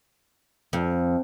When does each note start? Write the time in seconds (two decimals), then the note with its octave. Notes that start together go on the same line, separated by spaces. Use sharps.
0.73 F2